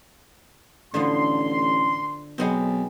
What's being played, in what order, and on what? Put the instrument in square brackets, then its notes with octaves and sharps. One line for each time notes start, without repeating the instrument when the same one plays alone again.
[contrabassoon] A1 [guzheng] D3 F3 B3 [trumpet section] C6
[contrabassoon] B1 [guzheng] G#3 B3 C4